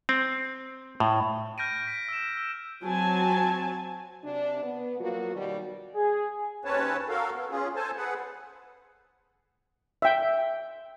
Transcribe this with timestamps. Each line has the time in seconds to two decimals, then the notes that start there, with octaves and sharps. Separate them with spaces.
0.09 C4
1.00 A2
1.58 F6 G6 A#6 D7 D#7
1.87 B6
2.09 E6 E7
2.37 E6
2.83 F#3 C4 G#5 A5
4.25 C3 D4
4.63 B3
5.00 F3 F#3 A#3 F4 F#4
5.35 D#2 B2 G3
5.95 G#4
6.65 D#2 C4 C#4 B4 C#5 A5
7.09 F#4 A4 A#4 F5
7.34 B3
7.50 C#4 F4 G#4
7.75 A4 C5 G#5 A5
7.96 G#4 B4 F#5
10.02 E5 G5